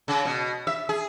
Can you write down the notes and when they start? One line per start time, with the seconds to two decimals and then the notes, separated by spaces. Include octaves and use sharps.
0.08 C#3
0.25 B2
0.67 E5
0.89 G#4